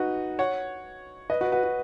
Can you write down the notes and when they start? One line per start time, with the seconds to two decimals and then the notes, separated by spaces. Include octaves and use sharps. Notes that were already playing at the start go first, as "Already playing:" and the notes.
Already playing: D#4 F#4 B4
0.39 C#5 F#5
1.30 B4 D#5
1.41 F#4 B4
1.52 F#4 B4
1.63 F#4